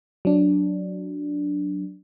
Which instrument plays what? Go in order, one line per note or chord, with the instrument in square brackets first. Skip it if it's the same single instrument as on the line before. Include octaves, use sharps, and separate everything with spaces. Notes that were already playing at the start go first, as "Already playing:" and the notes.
[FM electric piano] F#3 D4